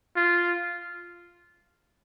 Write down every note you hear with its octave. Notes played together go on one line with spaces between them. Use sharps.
F4